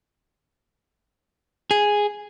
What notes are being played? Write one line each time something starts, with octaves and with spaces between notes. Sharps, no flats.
G#4